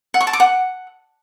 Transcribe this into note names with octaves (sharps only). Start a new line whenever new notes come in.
F#5
C#6
A5
D6
F#5